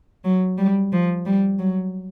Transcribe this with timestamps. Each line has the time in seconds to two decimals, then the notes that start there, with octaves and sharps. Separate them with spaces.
0.24 F#3
0.58 G3
0.92 F3
1.26 G3
1.59 F#3